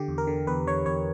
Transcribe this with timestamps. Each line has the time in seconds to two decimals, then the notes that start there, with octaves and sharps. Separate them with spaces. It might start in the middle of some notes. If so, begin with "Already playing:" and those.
Already playing: D3 G4
0.08 E2
0.18 A#4
0.27 D3
0.47 E2 B4
0.67 D3 C#5
0.86 E2 C#5